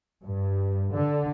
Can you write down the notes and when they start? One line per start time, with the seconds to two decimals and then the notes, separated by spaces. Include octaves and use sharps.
0.25 G2
0.93 D3